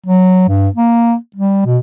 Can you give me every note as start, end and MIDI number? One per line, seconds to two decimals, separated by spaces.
0.06 0.45 54
0.48 0.68 43
0.75 1.15 58
1.36 1.61 55
1.65 1.78 47